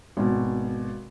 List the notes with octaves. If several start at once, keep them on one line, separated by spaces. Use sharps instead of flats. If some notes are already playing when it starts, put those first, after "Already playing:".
G#1 B2